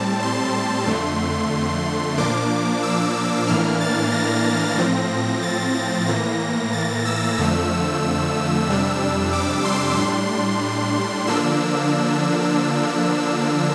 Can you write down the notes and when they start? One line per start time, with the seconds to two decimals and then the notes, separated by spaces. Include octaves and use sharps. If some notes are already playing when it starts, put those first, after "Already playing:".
Already playing: A2 G3 C4 A5
0.23 C6
0.87 F2 D3 A3
2.18 A#2 F3 A#3 D4 D6
2.83 E6
3.47 A2 E3 A#3 D4 F6
3.80 A6
4.12 A#6
4.77 A2 F3 C4
5.42 A6
5.75 A#6
6.07 A2 E3 A#3 A#6
6.73 A6
7.05 E6
7.37 F2 D3 F3 A3 E6
8.68 F2 C3 G3 D4
9.33 D6
9.65 C6
9.97 A2 G3 D4 C6
11.27 D3 F3 A#3 D4 E6